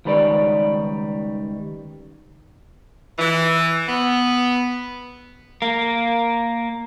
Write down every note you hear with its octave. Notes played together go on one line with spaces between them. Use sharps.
C#2 D#3 G3 B4 C#5 D5
E3
B3
A#3